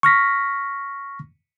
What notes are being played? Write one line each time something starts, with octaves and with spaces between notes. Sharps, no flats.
C#6 F6 A#6 B6